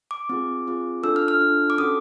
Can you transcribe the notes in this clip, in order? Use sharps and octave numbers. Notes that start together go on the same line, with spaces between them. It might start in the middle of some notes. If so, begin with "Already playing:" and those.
D6
C4 F4 G#4
C4 F4 G#4
D4 F4 A4 E6
F6
F6
D4 F4 A4
D6
C#4 F#4 A4 D#6